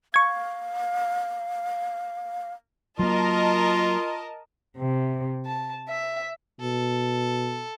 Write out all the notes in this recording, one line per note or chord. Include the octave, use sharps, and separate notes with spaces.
F5 C#6 G#6
F#3 A#3 F4 A#4 D#5 A5
C3
A5
E5
B2 A4